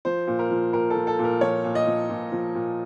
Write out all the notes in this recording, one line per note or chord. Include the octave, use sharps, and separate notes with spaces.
F3 C5
A#2
A#4
F3
A#2 A#4
A4
F3
A4
A#2
A#4
F3 C#5
A#2
D#5
F3
A#2
F3
A#2